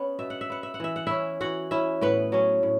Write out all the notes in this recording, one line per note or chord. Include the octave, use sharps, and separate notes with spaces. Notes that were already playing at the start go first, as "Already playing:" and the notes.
Already playing: B3 C#4 C#5
B2 E5
F#5
E5
B3 F#5
E5
F#5
E3 E5
F#5
C#4 E4 E5
E3 F#4 F#5
C#4 E4 E5
A2 B3 B4
F#3 C#4
A2